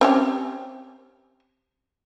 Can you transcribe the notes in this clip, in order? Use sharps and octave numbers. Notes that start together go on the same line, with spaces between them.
C4 C#4 G4